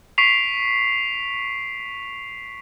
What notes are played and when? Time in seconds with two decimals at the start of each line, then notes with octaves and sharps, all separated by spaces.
0.18 C#6 B6 C7 D7 F7